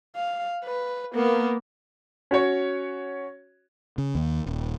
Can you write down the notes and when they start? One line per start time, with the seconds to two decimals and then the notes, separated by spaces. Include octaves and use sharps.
0.16 F5
0.64 B4
1.15 A#3 B3
2.31 C#4 F#4 C#5
3.98 C#3
4.15 D#2
4.46 D#1